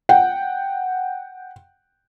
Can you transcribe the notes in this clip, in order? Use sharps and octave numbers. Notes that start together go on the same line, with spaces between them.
F#5 G5